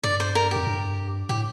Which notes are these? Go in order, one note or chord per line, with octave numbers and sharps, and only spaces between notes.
G2 D5
C5
A#4
F2 G4
G2
A2 G4